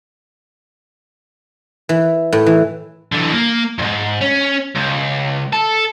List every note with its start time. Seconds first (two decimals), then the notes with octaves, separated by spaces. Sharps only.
1.89 E3
2.33 A2
2.46 E3
3.12 D3 E3
3.34 A#3
3.79 F2 G#2
4.21 C#4
4.75 C#2
5.53 A4